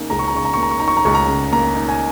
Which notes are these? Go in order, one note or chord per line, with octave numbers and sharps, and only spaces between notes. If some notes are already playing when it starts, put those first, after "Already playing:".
Already playing: C#3 A#3 D#4
C#2 A#5
C#6
A#5
C#3 C#6
A#5
A#3 C#6
A#5
C#6
D#4 A#5
C#6
A#5
C#2 C#6
A#5
C#3
A#3 A#5
D#4
G#5